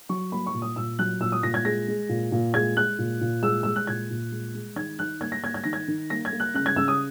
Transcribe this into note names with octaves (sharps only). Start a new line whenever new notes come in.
F#3 C#6
A#3 B5
C#6
A#2
D#6
A#2 E6
F#3 F#6
A#2 E6
D#6
A#2 A#6
G#6
G#3 A#6
G#3
A#2
A#2
G#3 G#6
G#3 F#6
A#2
A#2
G#3 E6
G#3 E6
F#6
A#2 G#6
A#2
G#3
G#3
D#3 G#6
D#3 F#6
A#3 G#6
A#6
A#3 G#6
G#6
D#3 A#6
G#6
D#3
A#3 A#6
G#6
A#3
F#6
C#3 F#6
G#6
C#3 E6
D#6